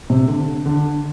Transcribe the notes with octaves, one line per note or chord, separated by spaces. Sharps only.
C3
D3
D3